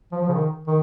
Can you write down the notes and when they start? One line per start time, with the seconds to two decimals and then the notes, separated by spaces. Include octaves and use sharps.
0.12 F3
0.23 F3
0.28 C#3
0.34 D#3
0.67 D#3